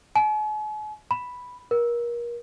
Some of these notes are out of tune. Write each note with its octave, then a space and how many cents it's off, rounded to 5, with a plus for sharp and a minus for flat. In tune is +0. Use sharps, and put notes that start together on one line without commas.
G#5 +45
B5 +0
A#4 +30